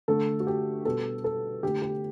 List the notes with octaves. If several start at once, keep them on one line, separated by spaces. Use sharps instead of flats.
D3 A3 A4
F#4
G4
B2 G3 B3 A4
A4
D3 A3 G4
G4